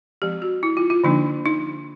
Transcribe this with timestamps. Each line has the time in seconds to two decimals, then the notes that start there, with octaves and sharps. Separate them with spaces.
0.22 F3 G#3 C4 G4
0.42 F#4
0.63 E4
0.77 F4
0.90 F4
1.04 D3 F3 A#3 D4 D#4
1.46 D#4